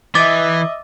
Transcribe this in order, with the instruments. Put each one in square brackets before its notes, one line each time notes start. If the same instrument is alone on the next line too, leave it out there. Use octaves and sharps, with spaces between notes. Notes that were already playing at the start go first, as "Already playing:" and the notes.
[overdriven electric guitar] E3 [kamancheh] D#5 E5 [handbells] D6 A6